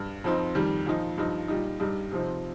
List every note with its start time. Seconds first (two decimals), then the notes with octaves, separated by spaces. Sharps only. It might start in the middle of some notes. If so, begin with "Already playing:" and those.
Already playing: G2
0.24 F2 F3 C4 D#4
0.55 F2 D#3 G3
0.86 A#2 F3 D#4
1.18 G2 F3 D#4
1.48 A#2 G3 D#4
1.80 G2 G3 D#4
2.12 C3 F3 C4 D#4